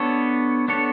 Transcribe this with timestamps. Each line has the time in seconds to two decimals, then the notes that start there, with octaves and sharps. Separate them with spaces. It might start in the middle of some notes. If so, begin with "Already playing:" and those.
Already playing: B3 D4 A4 C#5
0.68 B3 D4 A4 C#5